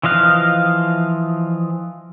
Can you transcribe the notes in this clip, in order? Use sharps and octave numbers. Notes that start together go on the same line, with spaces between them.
E3 F3 D#5 F5 F#6